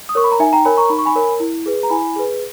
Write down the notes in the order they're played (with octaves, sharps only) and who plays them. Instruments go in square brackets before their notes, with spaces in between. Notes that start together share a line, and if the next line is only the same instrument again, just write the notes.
[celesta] D#6
A#4 C#5 C#6
B5
A#5
D#4 E5 G#5
G5 A#5
A#4 C#5 G#5 B5
A#5 C#6
D#4 B5
C#6
G#5 B5
A#4 C#5
E4
G#4 B4
A#5
E4 G#5 B5
G#4 B4